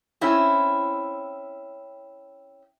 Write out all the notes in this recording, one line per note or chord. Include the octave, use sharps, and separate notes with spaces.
C4 C#4 E4